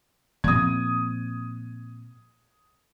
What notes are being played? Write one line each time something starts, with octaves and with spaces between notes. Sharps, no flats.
A#2 F3 C4 D#6 G#6